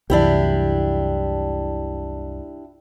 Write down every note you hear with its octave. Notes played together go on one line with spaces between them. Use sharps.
C2 F#2 E3 D4 E4 G4